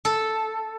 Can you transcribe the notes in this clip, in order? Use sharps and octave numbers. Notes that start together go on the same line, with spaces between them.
A4